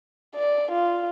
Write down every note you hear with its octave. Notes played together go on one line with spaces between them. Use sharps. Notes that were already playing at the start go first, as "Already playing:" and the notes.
D5
F4